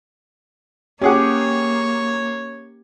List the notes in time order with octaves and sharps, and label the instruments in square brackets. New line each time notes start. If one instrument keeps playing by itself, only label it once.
[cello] A#3 [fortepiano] C#4 G#4 F#5 [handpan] G4 [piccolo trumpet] C#5